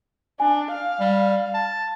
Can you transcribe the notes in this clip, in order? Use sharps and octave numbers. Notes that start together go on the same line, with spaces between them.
D4 G#5
F5
G3
A5